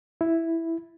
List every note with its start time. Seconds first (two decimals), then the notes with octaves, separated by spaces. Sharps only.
0.21 E4